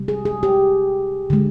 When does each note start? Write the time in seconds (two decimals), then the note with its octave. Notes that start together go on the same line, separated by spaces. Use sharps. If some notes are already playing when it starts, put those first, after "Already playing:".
Already playing: C3 G3
0.08 G#4
0.25 G#4
0.43 G4
1.30 D3 G#3